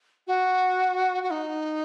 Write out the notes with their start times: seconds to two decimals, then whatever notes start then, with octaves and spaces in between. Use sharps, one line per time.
0.27 F#4
1.23 F#4
1.31 D#4